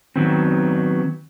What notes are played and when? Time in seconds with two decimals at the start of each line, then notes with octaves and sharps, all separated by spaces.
0.16 D#3 F#3 B3 C4